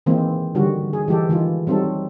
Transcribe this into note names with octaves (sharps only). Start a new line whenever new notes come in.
D#3 E3 G#3 A#3 C4
D3 D#3 G3 F#4
G#4
E3 G#3 G4 A4
D#3 E3 G#3 F4
F#3 G3 C4 D#4 A4